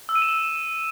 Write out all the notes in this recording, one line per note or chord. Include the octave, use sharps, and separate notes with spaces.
E6
D#7
E7
E6